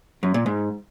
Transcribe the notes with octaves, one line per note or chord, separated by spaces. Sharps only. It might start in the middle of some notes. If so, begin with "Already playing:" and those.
F#2
A#2
G#2